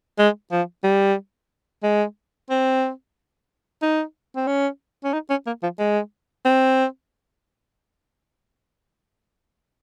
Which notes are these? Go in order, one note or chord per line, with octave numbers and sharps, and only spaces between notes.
G#3
F3
G3
G#3
C4
D#4
C4
C#4
C#4
D#4
C#4
A#3
F3
G#3
C4